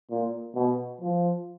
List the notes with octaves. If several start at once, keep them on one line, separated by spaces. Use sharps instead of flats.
A#2
B2
F3